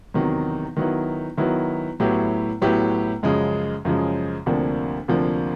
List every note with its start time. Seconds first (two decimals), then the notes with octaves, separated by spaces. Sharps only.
0.14 E2 C3 D#3 F#3
0.76 D#3 F#3 B3 E4
1.37 D#3 F#3 B3 E4
2.00 A2 F#3 B3 E4 G4
2.62 A2 F#3 B3 E4 G4
3.23 F#2 C#3 F3 G#3
3.85 F#2 C#3 F3 G#3
4.46 D2 C3 F3 A#3 D4
5.08 D2 C3 F3 A#3 D4